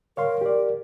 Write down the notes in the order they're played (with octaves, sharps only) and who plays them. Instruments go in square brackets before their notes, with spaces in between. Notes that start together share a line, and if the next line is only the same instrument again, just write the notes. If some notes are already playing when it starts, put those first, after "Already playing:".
[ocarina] A#4 [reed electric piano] C#5 F5 C6
[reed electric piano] G4 D5